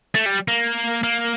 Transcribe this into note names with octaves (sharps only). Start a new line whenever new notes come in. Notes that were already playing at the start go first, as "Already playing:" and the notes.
A3
G3
A#3
A#3